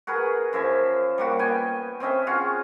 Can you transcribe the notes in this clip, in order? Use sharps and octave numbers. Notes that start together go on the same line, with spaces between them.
F#4 G#4 A#4 B4
F#2 F3 E5 G#5
G3 A#3 F#4
B3 G5 G#5
C4 C#4 D#5 E5
C#4 F4 F#4 G#4